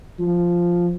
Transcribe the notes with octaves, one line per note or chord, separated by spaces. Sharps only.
F3